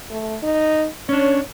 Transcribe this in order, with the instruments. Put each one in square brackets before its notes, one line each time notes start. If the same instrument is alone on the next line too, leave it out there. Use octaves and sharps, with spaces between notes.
[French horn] A3
D#4
[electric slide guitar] C#4 D4 [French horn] C#5